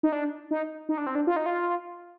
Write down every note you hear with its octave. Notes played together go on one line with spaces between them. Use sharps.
D#4
D4
D#4
D#4
D4
C4
D4
F4
D#4
F4